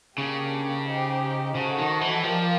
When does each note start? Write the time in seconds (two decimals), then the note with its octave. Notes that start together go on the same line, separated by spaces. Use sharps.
0.18 C#3 A#3 D4 G4
0.88 D#4 G4 C5
1.55 C#3 D#4 F#4 A4 C5
1.78 D#3
2.01 E3
2.24 F3 G4 A#4 D5 F5